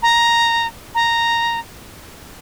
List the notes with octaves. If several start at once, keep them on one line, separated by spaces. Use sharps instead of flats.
A#5
A#5